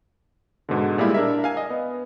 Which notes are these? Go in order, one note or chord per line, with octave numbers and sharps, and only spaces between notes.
G#2 B2 D3
A#2 G3 G#3 E4
D4 A#4 E5
F5 G#5
D#5
B3